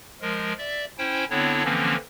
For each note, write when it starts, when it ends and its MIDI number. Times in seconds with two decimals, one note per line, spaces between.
0.21 0.53 53
0.21 0.53 56
0.21 0.53 70
0.58 0.85 74
0.58 0.85 76
0.98 1.25 61
0.98 1.25 64
0.98 1.25 72
0.98 1.25 79
1.30 1.63 50
1.30 1.63 59
1.30 1.63 60
1.30 1.63 62
1.30 1.63 64
1.30 1.63 73
1.64 1.96 50
1.64 1.96 52
1.64 1.96 53
1.64 1.96 58
1.64 1.96 60
1.64 1.96 61